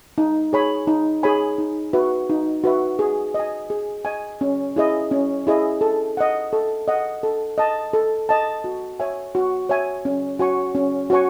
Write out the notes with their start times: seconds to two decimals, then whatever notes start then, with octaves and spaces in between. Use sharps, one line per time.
0.18 D#4
0.53 G#4 C#5 G#5 B5
0.87 D#4
1.23 G#4 C#5 G#5 B5
1.58 D#4
1.93 F#4 B4 E5
2.30 D#4
2.64 F#4 B4 E5
2.99 G#4
3.34 D#5
3.40 G#5
3.70 G#4
4.05 D#5 G#5
4.41 C#4
4.76 E4 G#4 D#5
5.11 C#4
5.47 E4 G#4 D#5
5.81 A4
6.17 D#5 F#5
6.53 A4
6.88 D#5 F#5
7.23 A4
7.58 D#5 A5
7.93 A4
8.29 D#5 A5
8.64 F#4
9.00 C#5 E5 G#5
9.35 F#4
9.69 C#5 E5 G#5
10.05 C#4
10.39 F#4 C#5 G#5 C#6
10.75 C#4
11.10 F#4 C#5 G#5 C#6